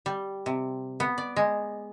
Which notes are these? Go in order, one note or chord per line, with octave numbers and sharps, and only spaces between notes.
G3
C3
B3
D5
G#3